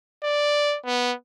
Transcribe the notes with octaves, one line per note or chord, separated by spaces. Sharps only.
D5
B3